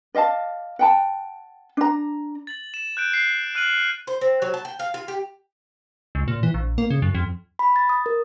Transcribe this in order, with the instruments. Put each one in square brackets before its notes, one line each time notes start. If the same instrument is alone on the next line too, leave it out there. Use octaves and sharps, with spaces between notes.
[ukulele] D5 D#5 F5 A5
F#5 G5 A5
D4 A#5
[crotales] A6 F#7
E7
F#6 G6 D7
C7
F6 F#6 D#7 E7 F#7
[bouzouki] C5
C4
F#3
A5
G5
F5
F4
G4
[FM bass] C#2
A#2
E3
A#1
A#3
C#3
F#2
F2
[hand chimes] B5
A6
D#6
A#4